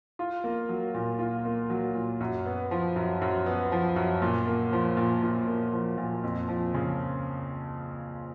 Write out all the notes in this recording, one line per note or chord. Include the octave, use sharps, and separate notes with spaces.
F4
A#3
F#3
A#2
F4
A#3
F#3
A#2
F#2
B3
F3
F#2
F#2
B3
F3
F#2
A#2
A#3
F3
A#2
A#2
A#3
F3
A#2
F2
F3
C#3